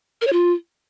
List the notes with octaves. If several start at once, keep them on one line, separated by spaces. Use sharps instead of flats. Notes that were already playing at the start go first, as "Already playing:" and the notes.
A#4
C#5
F4